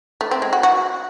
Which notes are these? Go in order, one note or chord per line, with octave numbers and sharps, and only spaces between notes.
A3
C4
G#3
F#4
F#4